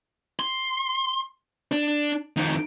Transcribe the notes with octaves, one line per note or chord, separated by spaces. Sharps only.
C6
D4
F2 D#3